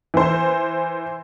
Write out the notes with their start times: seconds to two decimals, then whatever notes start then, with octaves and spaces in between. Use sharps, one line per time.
0.14 E3 C5